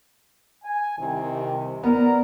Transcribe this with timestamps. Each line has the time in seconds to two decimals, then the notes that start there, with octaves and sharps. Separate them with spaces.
0.64 G#5
0.99 C2 C3 D#3
1.83 B3 A#4 D5 A#5